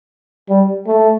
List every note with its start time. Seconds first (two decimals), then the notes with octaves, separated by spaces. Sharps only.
0.49 G3
0.86 A3